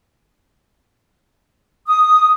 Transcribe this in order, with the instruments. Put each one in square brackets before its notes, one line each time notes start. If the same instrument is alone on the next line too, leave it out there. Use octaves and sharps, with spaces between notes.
[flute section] D#6